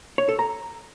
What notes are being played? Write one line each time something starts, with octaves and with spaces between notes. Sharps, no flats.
C#5
A4
A#5